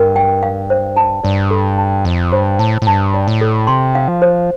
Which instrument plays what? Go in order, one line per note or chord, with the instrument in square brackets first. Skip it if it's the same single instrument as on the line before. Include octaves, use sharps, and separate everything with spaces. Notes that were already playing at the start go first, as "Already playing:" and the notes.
Already playing: [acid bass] G2 [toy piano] A#4
[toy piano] G5
F5
C5
A5
[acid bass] G2 [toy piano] D5
[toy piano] A4
A5
[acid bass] F2 [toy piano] D#5
[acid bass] G2 [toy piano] C5
[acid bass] A2 [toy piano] A5
[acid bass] A2
[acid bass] G2 [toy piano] A5
[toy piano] D5
[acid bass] A2
[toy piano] A4
[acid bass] C3 [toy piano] C6
[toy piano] F5
[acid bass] F3
[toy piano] C5